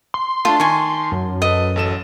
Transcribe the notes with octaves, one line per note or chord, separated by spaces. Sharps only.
C6
A3 D4 F4 A5
D#3 G#5 C#6
F#2
A4 B4 D#5
A1 A4 E7